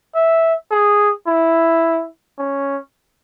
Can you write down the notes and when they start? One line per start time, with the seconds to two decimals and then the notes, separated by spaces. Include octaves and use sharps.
0.14 E5
0.71 G#4
1.27 E4
2.39 C#4